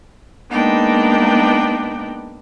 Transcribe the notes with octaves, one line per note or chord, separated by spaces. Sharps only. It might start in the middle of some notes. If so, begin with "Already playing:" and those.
G#3 A#3 B3 D4 D#4 G5